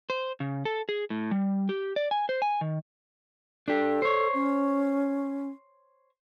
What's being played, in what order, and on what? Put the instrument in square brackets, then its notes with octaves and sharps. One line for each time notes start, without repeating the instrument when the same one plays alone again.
[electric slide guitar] C5
C#3
A4
G#4
A2
G3
G4
D5
G#5
C5
G#5
D#3
[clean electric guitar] D4 G4 [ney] A4
[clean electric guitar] C5 C#5
[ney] C#4